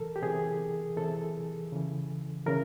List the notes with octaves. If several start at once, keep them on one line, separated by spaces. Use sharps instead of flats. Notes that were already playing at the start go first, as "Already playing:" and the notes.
Already playing: C3 E3 A4 A#4
G4
C3 E3 G#4
C3 E3 A4
C#3 E3
C#3 E3 A#4